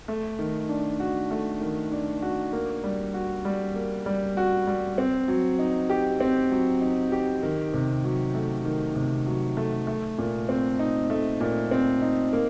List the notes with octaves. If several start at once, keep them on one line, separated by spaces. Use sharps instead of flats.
A3
D#3
D4
F#4
A3
D#3
D4
F#4
A#3
G3
F#4
G3
A#3
G3
F#4
G3
C4
F#3
D#4
G4
C4
F#3
D#4
G4
D#3
C3
F#3
A3
D#3
C3
F#3
A3
A3
A#2
C4
D#4
A3
A#2
C4
D#4
A#3